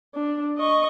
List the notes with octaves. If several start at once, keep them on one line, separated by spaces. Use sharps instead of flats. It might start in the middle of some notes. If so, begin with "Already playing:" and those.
D4
D#5 C#6